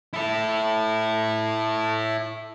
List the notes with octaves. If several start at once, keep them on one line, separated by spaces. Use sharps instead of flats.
E4 A4